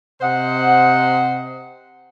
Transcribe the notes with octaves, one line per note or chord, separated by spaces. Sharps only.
C3 C5 D#5 F#5